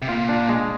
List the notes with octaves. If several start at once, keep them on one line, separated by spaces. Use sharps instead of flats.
C3
A#2 F4
D4
G#3